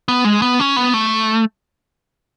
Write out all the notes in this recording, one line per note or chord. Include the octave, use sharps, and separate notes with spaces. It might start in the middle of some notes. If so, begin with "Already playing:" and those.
B3
G#3
B3
C#4
B3
A3